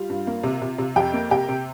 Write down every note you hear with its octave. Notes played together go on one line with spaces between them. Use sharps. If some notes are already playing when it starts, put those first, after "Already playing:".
Already playing: G3 F4 F5
G2
A#3
C3
C3
C3
F2 G4 G5
A#3
C3 G4 G5
C3